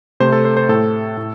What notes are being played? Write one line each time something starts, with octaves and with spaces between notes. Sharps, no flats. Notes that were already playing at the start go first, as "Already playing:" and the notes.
C3 A3 C5
A4
C5
C5
A2 A3 A4
A2